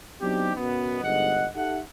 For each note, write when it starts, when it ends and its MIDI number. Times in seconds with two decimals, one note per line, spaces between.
0.21 0.53 54
0.21 0.53 59
0.21 0.53 60
0.21 0.53 62
0.21 0.53 63
0.21 0.53 67
0.56 1.00 42
0.56 1.00 47
0.56 1.00 59
1.03 1.47 31
1.03 1.47 44
1.03 1.47 75
1.03 1.47 78
1.55 1.79 63
1.55 1.79 67
1.55 1.79 69
1.55 1.79 76
1.55 1.79 78